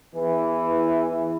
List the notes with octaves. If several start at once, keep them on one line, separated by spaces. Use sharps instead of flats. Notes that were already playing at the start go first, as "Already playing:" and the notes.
E2 E3